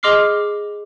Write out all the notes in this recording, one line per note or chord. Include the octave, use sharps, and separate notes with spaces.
G#4 D#5 C6 D6 F6 C7